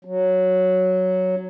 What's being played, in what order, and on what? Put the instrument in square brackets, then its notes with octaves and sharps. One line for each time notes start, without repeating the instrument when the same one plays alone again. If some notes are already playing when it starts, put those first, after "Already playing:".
[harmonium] F#3